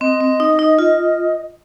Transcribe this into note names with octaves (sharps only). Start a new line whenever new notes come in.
C4 D#5
C4
D#4
D#4
F4